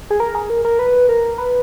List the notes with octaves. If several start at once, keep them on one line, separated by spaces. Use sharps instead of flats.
G#4
A#4
G#4
A#4
A#4
B4
A#4
B4